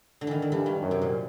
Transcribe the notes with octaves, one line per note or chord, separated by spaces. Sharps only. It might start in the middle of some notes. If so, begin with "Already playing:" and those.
D3
D#3 E3
D3
G2 E3
D#3
F#2
C3
A#2